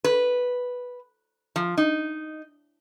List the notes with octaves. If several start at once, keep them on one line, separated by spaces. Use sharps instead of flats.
B4
F3
D#4